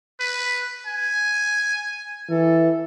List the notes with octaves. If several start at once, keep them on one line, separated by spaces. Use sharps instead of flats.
B4
G#5
E3 A4